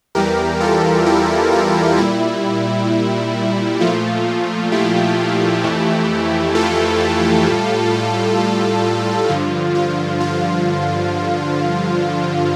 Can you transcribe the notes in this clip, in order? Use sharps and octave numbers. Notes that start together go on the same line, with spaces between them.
E2 E3 G3 G4 A#4
F4 A4
E4 G4
F4
A#2 G3 E4
A#2 F3 A3 F4
E4 G4
F2 E3 A3
F4 A4
A2 G3
F4
G2 D3 F3 F4
F4
F4